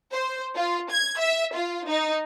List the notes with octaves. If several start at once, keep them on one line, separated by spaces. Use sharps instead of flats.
C5
F4
G#6
E5
F4
D#4